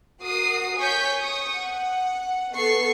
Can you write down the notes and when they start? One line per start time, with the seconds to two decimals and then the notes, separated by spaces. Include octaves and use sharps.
0.22 F#4 A#4 D#6 C7
0.79 C#5 G#5 C#6 G6 B6
1.19 C#6 D#6
1.55 F#5
2.55 B3 A4 C#6 C7